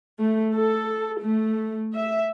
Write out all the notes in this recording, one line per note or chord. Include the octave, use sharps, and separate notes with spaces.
A3
A4
A3
E5